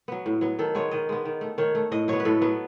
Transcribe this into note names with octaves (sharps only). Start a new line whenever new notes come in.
F#3 B3
A2
F#3 B3
D#3 A4
G#3 B3 C#5
D#3 D#5
G#3 B3
D#3
A3
D#3 C#5
A3
A2 D#5
F#3 B3 C#5
B4
A2 A4
F#3 B3